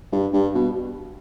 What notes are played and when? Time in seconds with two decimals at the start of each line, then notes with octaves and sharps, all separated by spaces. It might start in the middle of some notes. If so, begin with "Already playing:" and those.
0.12 G2
0.33 G2
0.54 B2